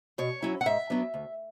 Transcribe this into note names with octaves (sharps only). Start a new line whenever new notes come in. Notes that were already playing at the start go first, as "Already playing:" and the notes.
B2 C#5
F#3 C#4 E4
F#5
G#2 E5
F#3 B3 D4
D2